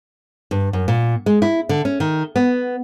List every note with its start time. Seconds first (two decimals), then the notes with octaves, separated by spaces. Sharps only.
0.51 G2
0.73 F#2
0.88 A#2
1.26 G#3
1.42 E4
1.69 D3
1.85 C#4
2.00 D#3
2.36 B3